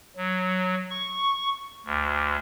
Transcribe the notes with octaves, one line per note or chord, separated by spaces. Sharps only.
F#3
C#6
D2